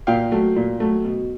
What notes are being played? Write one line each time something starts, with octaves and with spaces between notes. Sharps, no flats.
A#2 F5 G5
F#3 A3
A#2
F#3 A3
B2